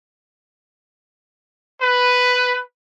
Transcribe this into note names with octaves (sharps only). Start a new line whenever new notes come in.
B4